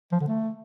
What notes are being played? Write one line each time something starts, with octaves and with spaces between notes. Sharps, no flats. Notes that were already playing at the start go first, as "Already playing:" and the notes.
F3
D3
A3